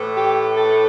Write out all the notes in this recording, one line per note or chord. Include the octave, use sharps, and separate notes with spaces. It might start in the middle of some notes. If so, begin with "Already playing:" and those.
Already playing: A2 E3 A3
G4
A4